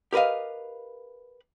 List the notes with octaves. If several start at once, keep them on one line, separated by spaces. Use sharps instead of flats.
G4 A#4 B4 D#5 F5